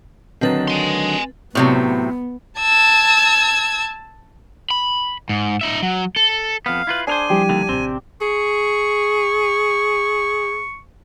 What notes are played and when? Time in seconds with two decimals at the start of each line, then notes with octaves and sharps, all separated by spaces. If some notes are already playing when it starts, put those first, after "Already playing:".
0.41 D3 D#3 F#3 C4 B4 A6
0.68 G#5 C6
1.55 A2 C3 F#3 B3
2.60 A5 E6 G#6
4.71 B5
5.29 G#2
5.61 D#4 E5
5.82 F#3
6.16 A4
6.66 F2 B3 F5
6.87 E4 F4 B4
7.07 D4 G#4 A#4 C5 G#5
7.30 F3 G3 E4 G4
7.49 D#2 D3 D#3
7.69 A1 C3 C4
8.21 G#4 C#6